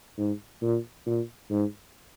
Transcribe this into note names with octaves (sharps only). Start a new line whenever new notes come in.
G#2
A#2
A#2
G#2